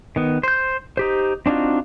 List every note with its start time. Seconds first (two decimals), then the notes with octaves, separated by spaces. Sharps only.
0.16 D#3 B3
0.43 C5 G6
0.97 D#4 G4 C5
1.46 C4 D4 D#4 F4 F#4